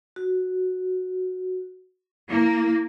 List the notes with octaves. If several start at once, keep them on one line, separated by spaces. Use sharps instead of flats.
F#4
A#3 E4